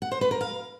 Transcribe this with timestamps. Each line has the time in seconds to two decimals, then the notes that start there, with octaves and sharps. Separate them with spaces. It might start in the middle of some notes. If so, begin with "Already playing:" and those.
0.02 F#5
0.12 C5
0.21 B4
0.31 A#4
0.41 F5